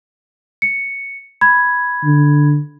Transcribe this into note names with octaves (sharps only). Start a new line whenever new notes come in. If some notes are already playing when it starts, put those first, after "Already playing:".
C#7
B5 G#6
D3